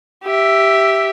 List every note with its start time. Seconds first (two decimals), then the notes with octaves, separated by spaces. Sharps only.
0.24 G4 E5